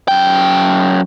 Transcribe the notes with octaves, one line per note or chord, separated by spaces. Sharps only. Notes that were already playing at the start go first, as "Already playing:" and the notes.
F#2 G5